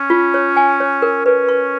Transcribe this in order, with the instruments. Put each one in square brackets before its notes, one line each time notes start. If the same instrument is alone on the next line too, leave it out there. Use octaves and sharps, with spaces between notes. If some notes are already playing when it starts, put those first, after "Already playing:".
Already playing: [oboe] C#4
[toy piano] F4
C#5
G#5
C#5
A#4
[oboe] C#4 [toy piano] B4
[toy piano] C#6